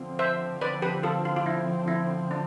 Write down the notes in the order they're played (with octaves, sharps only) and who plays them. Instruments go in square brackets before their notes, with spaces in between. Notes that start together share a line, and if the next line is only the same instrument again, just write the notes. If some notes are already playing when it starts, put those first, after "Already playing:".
Already playing: [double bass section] D3 F3 C4
[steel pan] C5 E5
B4 D5
G4 B4
F4 A4
F4
F4
E4
E4
D4